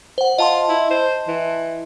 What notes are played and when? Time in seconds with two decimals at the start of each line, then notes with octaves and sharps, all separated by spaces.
0.18 C5 F#5
0.38 F4 D#5 A5 C6
0.69 E4
0.90 C5
1.28 E3